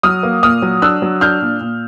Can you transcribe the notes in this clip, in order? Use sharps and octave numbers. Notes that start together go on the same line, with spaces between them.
F#3 D#6 F6
A#3
A#2 D#6 F6
F#3
D4 E6 F#6
F#3
D4 F6 G6
A#2
A#2